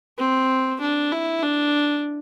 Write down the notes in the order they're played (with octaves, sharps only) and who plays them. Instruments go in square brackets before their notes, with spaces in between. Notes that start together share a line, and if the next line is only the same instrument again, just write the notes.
[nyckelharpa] C4
D4
E4
D4